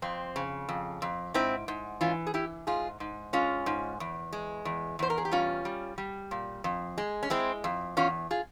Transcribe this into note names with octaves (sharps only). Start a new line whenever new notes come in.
F2 C4
C#3
F2
F2
G#2 C4 E4
G#2
E3 C#4 F4
G#4
E3 E4 G4
G#2 F4 G#4
G#2
G#3 C#4 F4
G#2
E2
G#3
E2
E2 C5
A#4
G#4
G4
G3 C#4 F4
G3
G3
A#2
F2
G#3
C#4
G#3 C4 E4
F2
E2 C#4 F4
F4 G#4